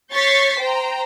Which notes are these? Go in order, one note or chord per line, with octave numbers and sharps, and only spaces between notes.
C#5 C#6 G6 A6 B6 C7
C5 G5 A#5